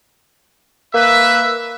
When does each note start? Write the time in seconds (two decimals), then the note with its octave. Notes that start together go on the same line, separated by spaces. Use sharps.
0.94 A#3 B4 E5